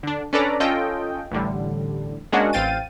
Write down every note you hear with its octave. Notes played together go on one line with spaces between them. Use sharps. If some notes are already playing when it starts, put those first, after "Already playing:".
D3 D4
C#4 D4 A4 B4 D5 A#5
C#4 F4 A4 D#5 G5
A1 A2 D3 G3
G#3 A#3 C#4 D4 F#4 F#5
A1 C4 F5 G5 A6 D#7